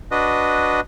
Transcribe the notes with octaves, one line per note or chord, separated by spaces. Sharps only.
D4 F#4 B4 D#5